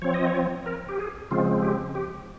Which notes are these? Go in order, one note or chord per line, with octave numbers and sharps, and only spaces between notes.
F3 C4 C#5
D#5
C#5
A#4
G4
G#4
C#3 F3 G#3 C4 F4
G4
G4